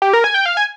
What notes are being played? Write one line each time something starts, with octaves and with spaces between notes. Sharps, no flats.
G4
A#4
G#5
G5
F5
G#5